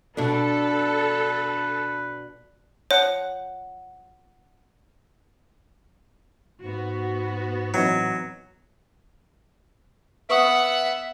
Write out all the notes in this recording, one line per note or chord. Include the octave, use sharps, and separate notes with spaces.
B2 D4 A4 B4
F3 C#5 F#5
G#2 B3 F#4
A2 E3 F#3 C4 D#4
B3 B4 E5 F#5 C#6 D#6